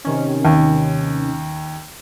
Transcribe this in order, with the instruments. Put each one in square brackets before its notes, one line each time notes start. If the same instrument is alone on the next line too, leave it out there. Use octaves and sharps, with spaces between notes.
[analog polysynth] C3 D#3 C#4
[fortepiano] D#2